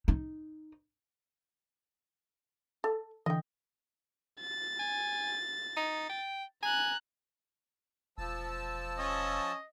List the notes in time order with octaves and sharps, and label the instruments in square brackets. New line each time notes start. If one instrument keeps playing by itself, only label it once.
[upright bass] D#4
[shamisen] A4
[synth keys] D3 E3 [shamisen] D#5 G5
[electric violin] A6
[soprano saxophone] G#5
D#4
G5
[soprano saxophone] G#5 [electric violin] A#5 F#6
[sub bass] E1 [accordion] F3 A5 E6
[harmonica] C#4 [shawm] D#5